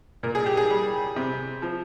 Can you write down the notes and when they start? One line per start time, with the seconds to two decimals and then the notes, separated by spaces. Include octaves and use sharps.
0.23 A#2 A#4
0.35 G#4
0.46 G4
0.57 G#4
0.70 G3
1.16 C3
1.62 F3